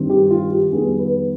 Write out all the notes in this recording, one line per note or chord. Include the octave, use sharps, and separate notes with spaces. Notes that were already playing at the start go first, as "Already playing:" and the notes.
Already playing: G2 D#3 G3 C4
G4
F4
G4
F2 D#3 G3 B3 G#4
B4